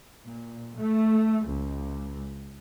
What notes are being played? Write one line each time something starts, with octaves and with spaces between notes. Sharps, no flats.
A#2
A3
C#2